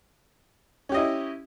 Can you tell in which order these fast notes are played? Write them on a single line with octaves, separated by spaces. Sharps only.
C#4 G4 D#5 E4